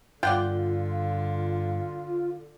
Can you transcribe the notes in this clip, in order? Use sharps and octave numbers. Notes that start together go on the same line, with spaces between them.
G2 D3 F4 D5 F#5 G5